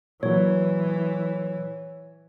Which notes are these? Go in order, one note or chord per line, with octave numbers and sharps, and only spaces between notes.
A#2 E3 F#3 C#5